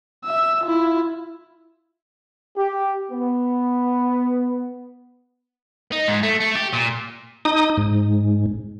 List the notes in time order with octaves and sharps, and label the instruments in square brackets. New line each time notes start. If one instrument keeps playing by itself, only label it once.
[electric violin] E5 E6
E4 F4
[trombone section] G4
B3
[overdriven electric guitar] D#4
G#2
A3
A3
G4
A#2
[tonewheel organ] D#4 D#6
G#2